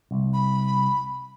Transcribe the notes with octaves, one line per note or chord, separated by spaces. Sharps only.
C2
B5